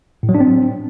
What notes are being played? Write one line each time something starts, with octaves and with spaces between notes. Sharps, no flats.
A2
F#3
D4
C4